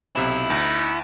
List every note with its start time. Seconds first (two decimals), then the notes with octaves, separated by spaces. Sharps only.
0.16 B1 C3 E4 E7
0.50 D2 B3 C#4 D#4